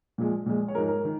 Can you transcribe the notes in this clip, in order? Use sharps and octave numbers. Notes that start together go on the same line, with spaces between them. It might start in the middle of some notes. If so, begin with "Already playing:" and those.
A#2 F3 G#3
A#2 F3 G#3
C#5
G#2 F3 G#3 A#4
A#4
D#3